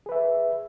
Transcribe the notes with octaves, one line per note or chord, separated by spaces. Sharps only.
G#4 B4 E5